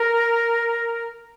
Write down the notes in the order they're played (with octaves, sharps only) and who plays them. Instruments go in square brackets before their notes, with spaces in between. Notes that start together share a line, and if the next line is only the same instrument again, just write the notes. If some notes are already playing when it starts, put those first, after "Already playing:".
Already playing: [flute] A#4